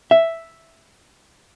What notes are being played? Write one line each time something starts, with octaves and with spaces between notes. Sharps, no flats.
E5